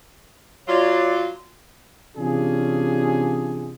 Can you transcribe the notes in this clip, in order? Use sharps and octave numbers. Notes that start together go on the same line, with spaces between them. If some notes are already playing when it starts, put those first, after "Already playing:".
F#3 F4 C#5 D5
C3 E3 C#4 D4 F4 G#4